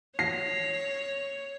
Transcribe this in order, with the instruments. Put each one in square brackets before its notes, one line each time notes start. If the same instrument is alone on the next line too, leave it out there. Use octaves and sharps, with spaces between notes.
[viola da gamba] C#5 [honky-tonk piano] A#6 C7